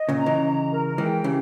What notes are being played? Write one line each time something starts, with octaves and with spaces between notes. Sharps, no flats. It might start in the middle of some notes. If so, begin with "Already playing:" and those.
Already playing: D#5
A#2 C#3
A#5
C#3 E3
A#5
A#4
E3 G#3 G5
C#3 E3 G4